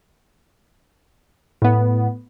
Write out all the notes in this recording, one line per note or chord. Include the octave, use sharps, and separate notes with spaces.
A2 B3